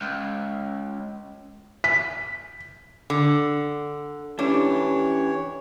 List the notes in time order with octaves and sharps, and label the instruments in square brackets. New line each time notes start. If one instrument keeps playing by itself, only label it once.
[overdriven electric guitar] C#2
[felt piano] B6
[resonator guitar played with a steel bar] D3
[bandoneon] E3 C#5 [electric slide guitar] C#4 E4 G4 [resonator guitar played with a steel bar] D4